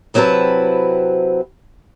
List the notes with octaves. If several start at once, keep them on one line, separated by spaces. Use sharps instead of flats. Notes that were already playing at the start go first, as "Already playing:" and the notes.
C3 F#3 C4 E4 B4 A5